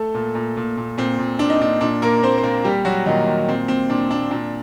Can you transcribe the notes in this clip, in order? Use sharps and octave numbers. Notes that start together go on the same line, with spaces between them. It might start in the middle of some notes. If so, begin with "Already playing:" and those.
Already playing: A3 A4
A#2
A#2
A#2
A#2
A#2 C4
A#2
A#2 D4
D#4
A#2 D4
A#2 D4
A#2 A#3 A#4
A#2 C4 C5
C5
A#2 A#3 A#4
A#2 G3 G4
A#2 F#3 F#4
A#2 D#3 D#4
A#2
A#2 C4
A#2 C4
A#2 D4
A#2 D4
A#2 D4